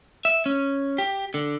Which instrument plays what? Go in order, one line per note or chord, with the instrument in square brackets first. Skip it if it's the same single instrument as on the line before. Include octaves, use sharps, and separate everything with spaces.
[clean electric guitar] E5
C#4
G4
D3